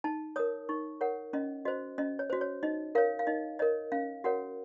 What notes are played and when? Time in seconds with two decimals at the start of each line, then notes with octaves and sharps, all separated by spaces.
0.04 D#4 A5
0.36 A#4 C#5 D#6
0.69 D#4 C#6
1.01 A#4 C#5 F#5
1.33 C#4 D#5
1.65 F#4 C5 D#5
1.98 C#4 D#5
2.19 C#5
2.30 F#4 C5
2.41 C#5
2.63 D#4 D#5
2.95 A#4 C#5 F5
3.19 F5
3.27 D#4 D#5
3.59 A#4 C#5 D#5
3.92 C#4 F5
4.24 F#4 A#4 C#5 F#5